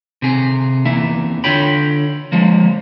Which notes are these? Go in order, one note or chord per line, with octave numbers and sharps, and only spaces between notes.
C3 G#4
E2 A#3 E4 E5
D3 F4 C#5 G5 B5
F3 G#3 A#3